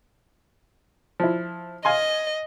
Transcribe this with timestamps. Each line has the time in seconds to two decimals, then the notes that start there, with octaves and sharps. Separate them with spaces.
1.20 F3 E4
1.85 D#5 F5 G#5 C6